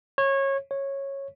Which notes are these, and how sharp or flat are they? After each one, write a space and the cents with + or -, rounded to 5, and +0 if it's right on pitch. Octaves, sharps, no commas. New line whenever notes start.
C#5 -20
C#5 -10